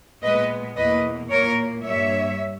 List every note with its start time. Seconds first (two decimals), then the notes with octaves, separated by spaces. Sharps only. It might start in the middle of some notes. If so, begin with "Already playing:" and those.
0.23 A#2 G#3 B3 B4 D#5
0.77 E2 B2 A#3 B4 D#5
1.30 A#2 A#3 A#4 C#5
1.84 G2 G3 A#3 C#5 E5